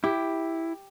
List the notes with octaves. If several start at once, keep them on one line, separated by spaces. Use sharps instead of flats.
E4 G4